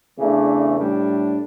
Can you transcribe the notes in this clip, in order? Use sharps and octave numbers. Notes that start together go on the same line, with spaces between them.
E2 C#3 E3 A3 D4
A2 G3 D4